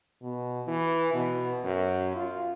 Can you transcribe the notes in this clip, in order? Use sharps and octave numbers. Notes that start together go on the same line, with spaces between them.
B2
E3
B2
F#2
F4